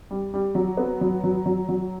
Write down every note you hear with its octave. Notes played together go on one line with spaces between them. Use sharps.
G3
G3
F#3
B3
F#3
F#3
F#3
F#3